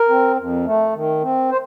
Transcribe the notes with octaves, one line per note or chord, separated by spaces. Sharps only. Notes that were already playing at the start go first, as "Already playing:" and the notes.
Already playing: A#4
C4
F2
A3
D#3
C4
C5